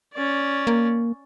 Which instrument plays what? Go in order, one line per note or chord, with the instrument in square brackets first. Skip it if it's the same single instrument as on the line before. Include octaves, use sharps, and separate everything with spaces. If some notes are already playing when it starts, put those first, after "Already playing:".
[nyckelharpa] C#4 D5
[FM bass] A#3